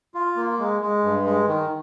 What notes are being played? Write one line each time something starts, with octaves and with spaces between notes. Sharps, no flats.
F4
A#3
G#3
G#3
G2
G#3
D#3